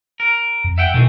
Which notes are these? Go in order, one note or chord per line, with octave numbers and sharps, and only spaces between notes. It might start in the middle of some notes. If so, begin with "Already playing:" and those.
A#4
F2
E5 F#5 G5
B2 D#3 E3 A3